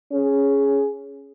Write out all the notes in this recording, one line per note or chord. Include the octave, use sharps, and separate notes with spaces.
C#4 G#4